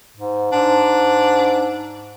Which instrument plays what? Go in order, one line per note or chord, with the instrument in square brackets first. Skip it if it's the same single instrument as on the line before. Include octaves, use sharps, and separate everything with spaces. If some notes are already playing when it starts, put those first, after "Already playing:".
[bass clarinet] G#2
[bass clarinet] G#2 [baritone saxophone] D4